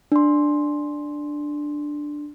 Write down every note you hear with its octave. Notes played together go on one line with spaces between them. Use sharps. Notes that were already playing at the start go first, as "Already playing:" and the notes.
D4 C6